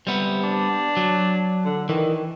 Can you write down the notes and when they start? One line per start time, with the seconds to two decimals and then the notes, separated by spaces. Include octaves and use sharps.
0.07 C3 G3 B3
0.43 D4
0.97 F#3
1.65 D3
1.89 D#3 E3